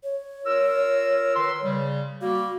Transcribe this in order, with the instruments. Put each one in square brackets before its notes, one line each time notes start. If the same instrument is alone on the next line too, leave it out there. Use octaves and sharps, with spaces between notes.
[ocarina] C#5
[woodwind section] F4 A#4 E6
D#3 B4 C6
C#3 G3
[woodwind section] G3 A#3 [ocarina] F#4